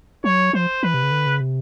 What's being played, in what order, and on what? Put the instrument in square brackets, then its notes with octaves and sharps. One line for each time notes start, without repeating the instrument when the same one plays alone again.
[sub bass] F#3 [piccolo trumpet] C#5
[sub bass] F3 [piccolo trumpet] C5
[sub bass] E3 [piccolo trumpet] B4
[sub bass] C3
C#3
D3
C#3
C3